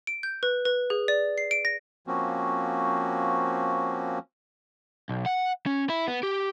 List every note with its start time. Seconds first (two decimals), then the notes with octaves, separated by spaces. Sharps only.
0.07 D7
0.23 G6
0.43 B4
0.65 B4
0.90 G#4
1.08 D5
1.38 C7
1.51 D7
1.65 A#6
2.07 F3 A#3 C4 C#4 F#4
5.09 B1
5.26 F#5
5.66 C#4
5.89 E4
6.08 B3
6.23 G4